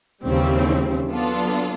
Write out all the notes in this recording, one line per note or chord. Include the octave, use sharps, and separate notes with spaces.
D#2 C#3 E3 G3 C4
F#3 B3 D4 F4 A4